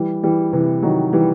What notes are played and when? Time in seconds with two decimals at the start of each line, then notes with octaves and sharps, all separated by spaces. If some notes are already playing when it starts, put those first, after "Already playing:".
Already playing: E3 G3
0.23 E3 G3
0.53 C3 E3
0.82 D#3 F#3
1.13 E3 G3